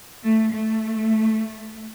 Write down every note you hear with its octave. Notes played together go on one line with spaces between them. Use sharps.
A3
A3